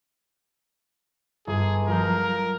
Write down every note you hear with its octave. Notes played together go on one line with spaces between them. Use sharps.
G1 G#4
F3 F#3 A#4 G6